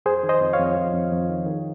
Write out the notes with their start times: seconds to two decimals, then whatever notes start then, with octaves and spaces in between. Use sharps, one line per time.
0.06 F2 G#4 C5
0.23 D#3
0.29 C5 D#5
0.41 F2
0.53 C#5 F5
0.59 F2
0.76 F2
0.93 F2
1.12 F2
1.29 D#3
1.46 D#3